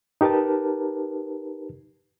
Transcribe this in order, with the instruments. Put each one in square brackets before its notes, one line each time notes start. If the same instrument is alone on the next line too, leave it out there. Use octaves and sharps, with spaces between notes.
[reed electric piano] D#4 G4 A#4 B4 A5